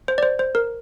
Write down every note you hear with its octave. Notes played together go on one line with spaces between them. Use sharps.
C5
D5
C5
C5
A#4